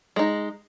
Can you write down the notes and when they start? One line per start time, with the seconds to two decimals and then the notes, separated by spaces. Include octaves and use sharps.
0.16 G#3 D#4